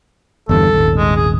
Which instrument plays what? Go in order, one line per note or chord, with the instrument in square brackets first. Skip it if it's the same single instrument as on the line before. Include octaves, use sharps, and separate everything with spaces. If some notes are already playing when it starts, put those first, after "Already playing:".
[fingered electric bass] G1 E2 G2 [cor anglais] A4
[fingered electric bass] D#1 G#1
[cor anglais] G#3
G#4